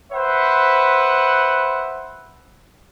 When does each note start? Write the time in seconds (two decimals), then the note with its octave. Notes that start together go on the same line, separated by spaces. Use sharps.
0.12 B4 C5 E5 F#5